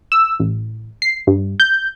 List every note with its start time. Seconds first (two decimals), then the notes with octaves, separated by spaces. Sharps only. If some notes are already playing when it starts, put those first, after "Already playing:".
0.12 E6
0.40 A1
1.02 C7
1.27 G2
1.60 G6